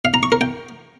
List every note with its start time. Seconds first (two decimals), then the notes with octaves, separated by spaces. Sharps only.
0.05 F5
0.14 A#5
0.23 C#6
0.32 A#4
0.41 G5